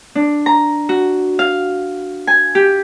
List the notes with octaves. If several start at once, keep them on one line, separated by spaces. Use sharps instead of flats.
D4
A#5
F#4
F5
G#5
G4